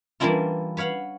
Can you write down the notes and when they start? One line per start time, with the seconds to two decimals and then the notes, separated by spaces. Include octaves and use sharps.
0.20 E3 G3 A#3 D4 E4 F4
0.77 B4 C#5 F5 F#5